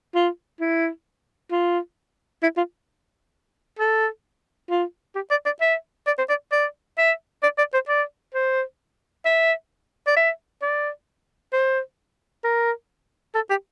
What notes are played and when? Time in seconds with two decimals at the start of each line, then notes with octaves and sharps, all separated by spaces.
0.15 F4
0.60 E4
1.51 F4
2.42 E4
2.57 F4
3.79 A4
4.70 F4
5.15 G4
5.31 D5
5.46 D5
5.61 E5
6.07 D5
6.18 C5
6.29 D5
6.52 D5
6.98 E5
7.43 D5
7.58 D5
7.74 C5
7.89 D5
8.34 C5
9.25 E5
10.07 D5
10.16 E5
10.62 D5
11.53 C5
12.44 A#4
13.35 A4
13.50 G4